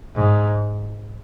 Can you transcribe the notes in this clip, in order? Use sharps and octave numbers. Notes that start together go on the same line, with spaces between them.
G#2